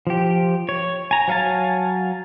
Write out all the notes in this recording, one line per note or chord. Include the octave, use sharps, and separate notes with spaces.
F3 G4
C#5
G#5 A#5
F#3 C#5 F5 G#5 A5